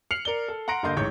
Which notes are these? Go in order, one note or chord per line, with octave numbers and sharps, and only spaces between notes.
F6 C7 C#7 F7 F#7
A#4 D5 G7
A4
F#5 A#5 C6 A#6 D7
G2 D3 A#3 D#5 C6 G6
A1 G#2 C#5 G6